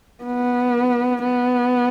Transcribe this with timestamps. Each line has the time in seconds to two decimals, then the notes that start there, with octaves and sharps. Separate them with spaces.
0.24 B3
1.24 B3